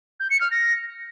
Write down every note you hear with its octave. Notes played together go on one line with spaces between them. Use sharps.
G6
C#7
F6
A#6